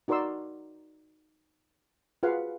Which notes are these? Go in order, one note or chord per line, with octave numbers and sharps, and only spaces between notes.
D#4 F#4 A#4 D5 C6 E6
F4 F#4 G#4 B4 F5 F#5